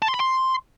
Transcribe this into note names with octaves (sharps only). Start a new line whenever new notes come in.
A5
C6
B5
C6